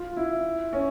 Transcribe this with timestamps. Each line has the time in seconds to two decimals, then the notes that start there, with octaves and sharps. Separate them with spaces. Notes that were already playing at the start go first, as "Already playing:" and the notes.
Already playing: F4
0.17 E4
0.73 C#4